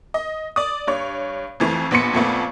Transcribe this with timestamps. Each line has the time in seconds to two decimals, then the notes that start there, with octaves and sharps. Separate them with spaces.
0.14 D#5
0.56 D5 D#6
0.87 G2 C#5
1.60 F2 E3 A3
1.91 A#1 B3 C6 C#7
2.13 F2 A#2 A3 B3